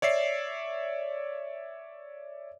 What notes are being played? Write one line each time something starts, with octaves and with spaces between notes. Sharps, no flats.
C#5 D5 E5 C7